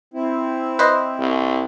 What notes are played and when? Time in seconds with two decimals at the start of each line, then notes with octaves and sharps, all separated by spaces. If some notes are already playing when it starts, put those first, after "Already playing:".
0.14 C4 E4
0.79 B4 C5 D#5
1.19 C2